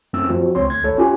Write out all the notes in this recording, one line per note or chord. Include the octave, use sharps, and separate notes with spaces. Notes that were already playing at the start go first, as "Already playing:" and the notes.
F#2 A3 C4 E6
F3 C4 F#4
C#2 C4 C#5 C6
D2 A3 G#6
G#1 A4 C#5
C#4 F4 G4 G#5